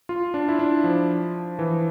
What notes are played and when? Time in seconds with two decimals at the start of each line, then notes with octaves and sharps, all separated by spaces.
0.09 F4
0.34 D4
0.49 E4
0.59 D4
0.84 F3
1.59 E3